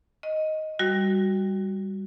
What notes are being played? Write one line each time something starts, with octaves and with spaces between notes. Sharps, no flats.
D#5
G3 F#4